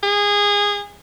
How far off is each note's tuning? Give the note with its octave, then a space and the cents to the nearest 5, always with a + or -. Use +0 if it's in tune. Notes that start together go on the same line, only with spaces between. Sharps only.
G#4 -20